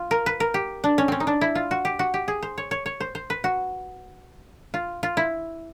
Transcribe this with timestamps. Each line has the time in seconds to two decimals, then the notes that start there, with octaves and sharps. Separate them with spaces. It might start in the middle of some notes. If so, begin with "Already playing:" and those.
Already playing: F4
0.11 A#4
0.26 B4
0.40 A#4
0.54 G4
0.84 D4
0.98 C#4
1.08 C4 C#4
1.20 D#4
1.27 D4
1.41 E4
1.55 F4
1.71 F#4
1.85 G4
1.99 F#4
2.14 G4
2.28 G#4
2.43 C5
2.58 C#5
2.71 C#5
2.86 C#5
3.00 C5
3.15 C5
3.30 B4
3.44 F#4
4.74 F4
5.03 F4
5.17 E4